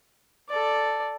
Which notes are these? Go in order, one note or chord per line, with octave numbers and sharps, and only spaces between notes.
A4 D5